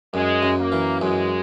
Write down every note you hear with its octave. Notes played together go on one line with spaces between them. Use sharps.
F#2 G#3
F#2
A#3
E3
F#2 G#3